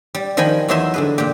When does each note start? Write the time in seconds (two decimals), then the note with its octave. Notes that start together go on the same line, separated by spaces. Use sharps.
0.15 G3
0.37 D#3 F3 D#5 G5 G#5 B5
0.68 E2 F#3 D#4 G#4 E5 C6
0.94 D3 G#4 B4
1.18 A#2 G4